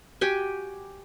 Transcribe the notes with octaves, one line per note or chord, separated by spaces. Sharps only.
F#4 G4 G5 G#5